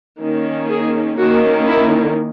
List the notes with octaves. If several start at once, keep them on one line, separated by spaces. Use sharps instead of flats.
D#3 A#3 C#4
G#4
D#3 A#3 C#4 F#4
E4